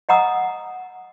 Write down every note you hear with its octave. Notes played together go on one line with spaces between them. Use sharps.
D#5 F#5 A#5 D#6 E6